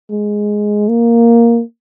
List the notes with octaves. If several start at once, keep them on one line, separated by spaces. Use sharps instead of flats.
G#3
A#3